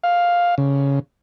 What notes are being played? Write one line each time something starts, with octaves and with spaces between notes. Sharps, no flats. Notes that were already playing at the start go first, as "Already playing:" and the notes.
F5
C#3